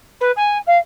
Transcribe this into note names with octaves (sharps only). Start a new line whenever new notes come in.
B4
G#5
F5